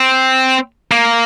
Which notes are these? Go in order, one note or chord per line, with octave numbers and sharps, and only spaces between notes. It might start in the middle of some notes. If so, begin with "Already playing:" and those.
Already playing: C4
A#3